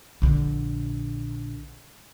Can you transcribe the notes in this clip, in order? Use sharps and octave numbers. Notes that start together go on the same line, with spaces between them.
A#1 D3